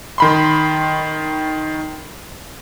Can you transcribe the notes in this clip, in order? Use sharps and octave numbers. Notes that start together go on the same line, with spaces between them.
D#3 B5 C6